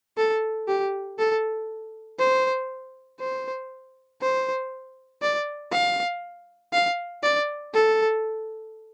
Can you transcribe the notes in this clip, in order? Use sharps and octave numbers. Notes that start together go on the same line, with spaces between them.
A4
G4
A4
C5
C5
C5
D5
F5
F5
D5
A4